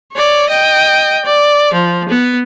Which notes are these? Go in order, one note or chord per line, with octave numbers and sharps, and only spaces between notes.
C#5 D5
D#5 G5
D5
F3
B3